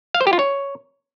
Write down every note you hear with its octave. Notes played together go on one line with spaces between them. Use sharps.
F5
C5
G4
F4
C#5